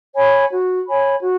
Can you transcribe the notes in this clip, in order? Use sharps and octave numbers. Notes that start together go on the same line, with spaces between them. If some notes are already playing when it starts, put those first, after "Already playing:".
C#5 G#5 B5
F#4
C#5 G#5 B5
F#4